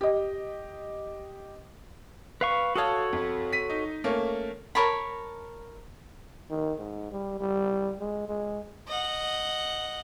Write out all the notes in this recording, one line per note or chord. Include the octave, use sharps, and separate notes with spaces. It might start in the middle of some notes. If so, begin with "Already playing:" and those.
G4 D#5
B4 F5 C#6
F#4 A4 C#5 F5 A5 D#6
F2
B6 D#7
D#4
A3 A#3 C#4
A#4 C#5 A5 B5
D#3
G#2
G3
G3
G#3
G#3
D#5 F#5